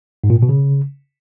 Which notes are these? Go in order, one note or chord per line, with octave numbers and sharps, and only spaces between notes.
G#2
A#2
A2
B2
C#3